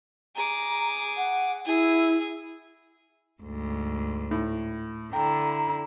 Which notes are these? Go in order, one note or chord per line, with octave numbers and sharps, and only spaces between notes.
G#4 A#5 D6
F#5
E4 G#4
D2 G#2
A2
D3 E4 G5 A#5